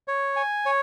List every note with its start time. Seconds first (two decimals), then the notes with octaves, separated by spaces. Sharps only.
0.08 C#5
0.36 G#5
0.66 C#5